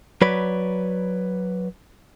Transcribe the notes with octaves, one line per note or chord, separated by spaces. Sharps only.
F#3 B4 C#5 D5 B5